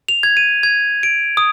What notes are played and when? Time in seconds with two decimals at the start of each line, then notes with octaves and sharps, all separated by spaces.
0.09 F7
0.23 G#6
0.37 D#7
0.63 G#6
1.03 D7
1.37 D#6